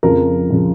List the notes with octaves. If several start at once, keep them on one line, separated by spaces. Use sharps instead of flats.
F2 C#3 F3 A#4
C#3 F3